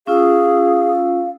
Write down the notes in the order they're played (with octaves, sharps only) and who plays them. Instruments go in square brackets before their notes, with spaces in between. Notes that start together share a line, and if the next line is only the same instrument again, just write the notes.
[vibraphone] C#4 F4 E6 [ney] G#4 [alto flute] F5